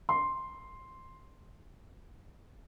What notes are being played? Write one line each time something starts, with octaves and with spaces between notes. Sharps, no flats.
C6